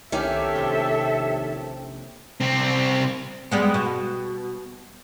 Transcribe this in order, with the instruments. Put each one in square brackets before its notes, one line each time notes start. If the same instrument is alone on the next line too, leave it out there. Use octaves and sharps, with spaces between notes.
[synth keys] C2 E4 D6 [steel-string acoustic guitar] D#3 C#4 [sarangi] G4 [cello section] A4 E5
[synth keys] A#1 C3 G5
[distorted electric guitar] C2 C4
[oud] G3 G#3 B3
B2